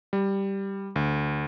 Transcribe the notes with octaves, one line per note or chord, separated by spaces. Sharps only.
G3
D2